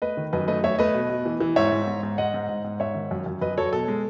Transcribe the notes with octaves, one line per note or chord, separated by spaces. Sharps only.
A3 B4 D#5
D#3
F#2 B4 D#5
A3 B4 D#5
A3 C#5 E5
A3 B4 D#5
B2
B2
E3
E3
G#2 C#5 E5
G#2
G#2
G#2
G#2 D#5 F#5
G#2
G#2
G#2
G#2 C#5 E5
D#3
F#2
F#2
F#2 B4 D#5
F#3 A4 C#5
B2 A4
G#3